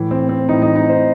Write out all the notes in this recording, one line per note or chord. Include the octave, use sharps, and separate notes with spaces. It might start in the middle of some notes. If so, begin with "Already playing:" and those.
Already playing: A2 E3
C4
C4
A2 E3 D#4
D#4
D#4
C5